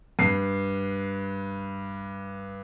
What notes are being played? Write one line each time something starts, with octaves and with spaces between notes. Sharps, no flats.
G2 C7